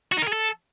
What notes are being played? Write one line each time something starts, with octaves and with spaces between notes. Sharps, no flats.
F#4
D#4
A#4
G#4
A4